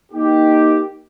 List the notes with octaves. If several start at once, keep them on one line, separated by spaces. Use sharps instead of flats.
A#3 D#4 G4